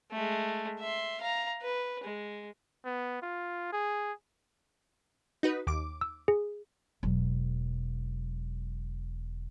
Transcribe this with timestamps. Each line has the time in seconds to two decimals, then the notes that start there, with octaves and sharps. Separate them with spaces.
0.12 G#3 A3
0.79 E5 C6
1.21 F5 A#5
1.62 B4
2.04 G#3
2.85 B3
3.22 F4
3.73 G#4
5.43 D#4 F#4 B4
5.67 D#2 D6
6.01 E6
6.28 G#4
7.03 E1 F#3